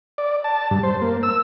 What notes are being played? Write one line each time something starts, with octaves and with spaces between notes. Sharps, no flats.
D5
A5
G2
C5
A#3
E6